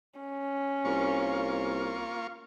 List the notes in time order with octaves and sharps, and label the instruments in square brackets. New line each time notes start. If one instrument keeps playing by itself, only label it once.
[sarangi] C#4
[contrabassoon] C2 [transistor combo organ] A#3 F4 C#6